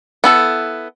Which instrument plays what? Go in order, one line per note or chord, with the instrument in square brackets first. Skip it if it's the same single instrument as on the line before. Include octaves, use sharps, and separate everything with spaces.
[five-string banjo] B3 E4 A4